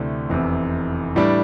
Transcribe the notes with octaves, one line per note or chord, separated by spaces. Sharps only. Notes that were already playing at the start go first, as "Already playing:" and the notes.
Already playing: D2 C3 E3 A3 D4
F1 E2 C3
A2 E3 G3 D4